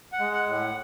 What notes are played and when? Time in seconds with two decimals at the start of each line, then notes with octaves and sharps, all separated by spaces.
0.13 F#5
0.19 G#3
0.33 F#5
0.47 A2
0.54 F#5